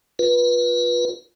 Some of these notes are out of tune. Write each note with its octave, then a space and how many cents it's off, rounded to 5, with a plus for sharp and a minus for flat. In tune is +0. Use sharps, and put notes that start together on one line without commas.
F4 +15 B4 -20